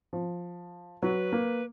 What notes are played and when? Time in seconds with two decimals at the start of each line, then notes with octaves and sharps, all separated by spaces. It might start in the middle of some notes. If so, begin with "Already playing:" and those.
0.13 F3
1.02 F#3 B4
1.32 A#3